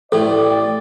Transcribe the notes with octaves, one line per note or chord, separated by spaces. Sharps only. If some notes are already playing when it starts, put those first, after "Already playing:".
A1 A2 A4 D5 G5